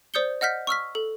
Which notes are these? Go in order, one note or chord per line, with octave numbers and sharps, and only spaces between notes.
C5 D5 D#6 G6 C#7 G7
D#5 F#5 F6 G6 B6
C#6 E6 F6 B6
A4